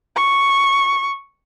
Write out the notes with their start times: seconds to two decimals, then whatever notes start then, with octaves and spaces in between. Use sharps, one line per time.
0.16 C#6